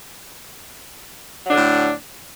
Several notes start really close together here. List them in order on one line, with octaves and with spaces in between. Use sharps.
F#3 D4 D3 A2